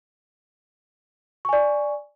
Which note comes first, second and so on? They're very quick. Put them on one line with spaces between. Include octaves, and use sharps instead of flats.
C#6 G#5 D5